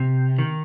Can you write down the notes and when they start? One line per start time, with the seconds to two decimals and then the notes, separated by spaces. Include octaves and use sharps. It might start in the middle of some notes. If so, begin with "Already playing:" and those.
Already playing: C3
0.39 D#3